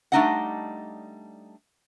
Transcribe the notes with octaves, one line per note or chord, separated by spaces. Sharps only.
G3 A3 D4 D#4 D#5 F#5